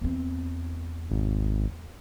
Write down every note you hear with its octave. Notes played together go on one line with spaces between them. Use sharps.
E2 C4
G#1